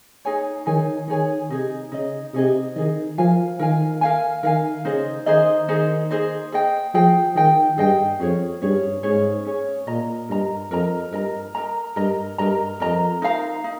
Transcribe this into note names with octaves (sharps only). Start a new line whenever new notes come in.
D#4 G#4 C#5 G#5
D#3 D#4 G#4 C#5 G#5
D#3 D#4 G#4 C#5 G#5
C3 D#4 G#4 D#5
C#3 D#4 G#4 D#5
C3 D#4 G#4 D#5
D#3 D#4 G#4 D#5
F3 A#4 F5 G#5
D#3 A#4 F5 G#5
A#4 F5 G#5
D#3 A#4 F5 G#5
C#3 D#4 G#4 C5 D#5
D#3 D#4 G#4 C5 D#5
D#3 D#4 G#4 C5 D#5
D#4 G#4 C5 D#5
G#4 D#5 G5
F3 G#4 D#5 G5
D#3 G#4 D#5 G5
G2 G#4 D#5 G5
F2 C#4 G#4 C#5
G2 C#4 G#4 C#5
G#2 C#4 G#4 C#5
C#4 G#4 C#5
A#2 A#4 D#5 A#5
G2 A#4 D#5 A#5
F2 A#4 D#5 A#5
G2 A#4 D#5 A#5
A#4 D#5 A#5
G2 A#4 D#5 A#5
G2 A#4 D#5 A#5
F2 A#4 D#5 A#5
D#4 A#4 F5 A#5
D#4